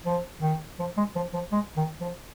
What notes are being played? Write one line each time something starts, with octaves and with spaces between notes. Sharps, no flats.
F3
D#3
F3
G#3
F3
F3
G#3
D#3
F3